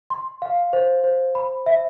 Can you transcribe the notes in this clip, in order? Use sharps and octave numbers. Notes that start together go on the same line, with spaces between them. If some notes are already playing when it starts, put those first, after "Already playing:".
C6
F5
C5
C5
B5
E5